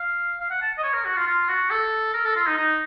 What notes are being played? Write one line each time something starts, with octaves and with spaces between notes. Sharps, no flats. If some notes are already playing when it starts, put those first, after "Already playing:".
Already playing: F5
F5
F#5
A5
D#5
C#5
A#4
F#4
F4
F4
F#4
A4
A#4
A4
F4
D#4
D#4